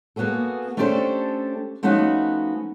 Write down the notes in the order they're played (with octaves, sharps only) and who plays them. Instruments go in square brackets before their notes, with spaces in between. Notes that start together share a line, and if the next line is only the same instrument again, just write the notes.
[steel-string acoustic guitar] A#3 B3 F#4 G#4 A4
A3 C#4 D4 G4 A4 C5
F3 A3 B3 C#4 D#4 F#4